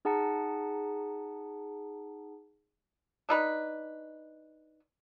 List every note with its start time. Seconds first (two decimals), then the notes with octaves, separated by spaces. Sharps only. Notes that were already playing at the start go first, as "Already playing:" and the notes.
0.05 D#4 G#4 F#5 A5 A#5 C#7
3.29 D4 D#4 B4